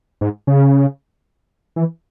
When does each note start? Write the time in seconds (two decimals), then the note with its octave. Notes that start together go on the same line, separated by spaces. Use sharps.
0.21 G#2
0.47 C#3
1.76 E3